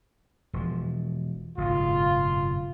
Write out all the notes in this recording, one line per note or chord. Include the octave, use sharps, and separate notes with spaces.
E1 F3
F#1 G#2 B2 F4